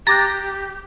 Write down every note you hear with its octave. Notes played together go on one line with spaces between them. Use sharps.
G4 A#5 D6 F#6 A6 A#6